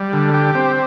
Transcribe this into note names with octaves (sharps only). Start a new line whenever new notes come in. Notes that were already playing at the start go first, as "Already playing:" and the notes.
Already playing: G3
D3
G4
C4